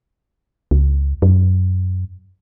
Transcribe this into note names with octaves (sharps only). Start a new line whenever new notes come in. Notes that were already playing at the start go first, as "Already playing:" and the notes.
C#2
F#2